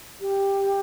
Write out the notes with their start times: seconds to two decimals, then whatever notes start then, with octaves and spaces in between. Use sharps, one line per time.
0.21 G4